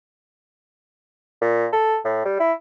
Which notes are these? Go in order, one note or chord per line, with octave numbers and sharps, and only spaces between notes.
A#2
A4
A2
G3
E4